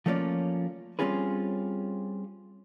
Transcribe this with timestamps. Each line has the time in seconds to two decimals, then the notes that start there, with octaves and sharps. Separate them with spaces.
0.06 F3 A3 A#3 C#4 F4 D5
0.99 G3 C4 C#4 F4 G#4 B4